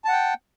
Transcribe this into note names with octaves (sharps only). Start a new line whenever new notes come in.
F#5 G5 A5